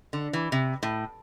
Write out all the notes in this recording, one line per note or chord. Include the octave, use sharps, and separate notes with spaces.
D3
E3
C3
A2